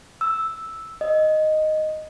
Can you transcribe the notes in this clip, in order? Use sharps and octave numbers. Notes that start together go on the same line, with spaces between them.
E6
D#5